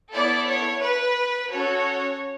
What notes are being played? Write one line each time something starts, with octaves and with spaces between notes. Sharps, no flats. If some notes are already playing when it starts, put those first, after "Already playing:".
B3 E4 A4 D5
C#5
B4
C#4 F#4 A4 C#5